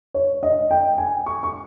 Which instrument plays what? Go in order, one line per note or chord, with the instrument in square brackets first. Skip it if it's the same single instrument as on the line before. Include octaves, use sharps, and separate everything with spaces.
[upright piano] C#5
D#5
G5
G#5
C#6
C#6